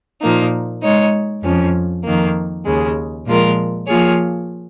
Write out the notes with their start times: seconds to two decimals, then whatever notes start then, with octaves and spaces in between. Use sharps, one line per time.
0.21 A#2 F3 A#3 D#4
0.82 G#3 D#4 C#5
1.43 F2 F3 C#4
2.04 F2 D#3 A#3
2.65 D#2 C#3 G#3
3.26 A#2 F3 G#3 F4 A#4
3.87 F3 A#3 F4 G#4 C#5